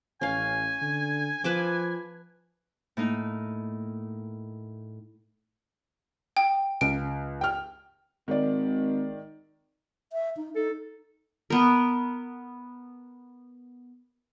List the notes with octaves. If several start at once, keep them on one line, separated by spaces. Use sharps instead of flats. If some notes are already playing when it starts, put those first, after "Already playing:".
A1 C#4 F5 G#5
D3
F3 B4 A5 D6
A2 A#3 D#4
G5
C#2 D7
G5 F6
G#1 D#3 D5
E5
D#4
D#4 A4
B3 A#4